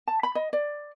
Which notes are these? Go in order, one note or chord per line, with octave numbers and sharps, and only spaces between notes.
A5
B5
D#5
D5